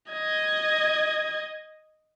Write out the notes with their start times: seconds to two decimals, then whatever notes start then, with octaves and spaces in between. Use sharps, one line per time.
0.12 D#5 G#6